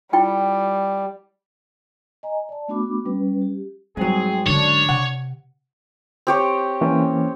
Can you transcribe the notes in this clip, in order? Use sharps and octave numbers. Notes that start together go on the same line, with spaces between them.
G3 E4 F4 G5
D#5 G#5 A#5
D5 A5
A3 B3 D4 F#4 B5 D6
G3 C#4 B4
G4
G#2 F#3 G3 C4 G#4
D3 C#4 D4 C#5
C3 F#5
C4 G4 C#5
E3 A#3 C#4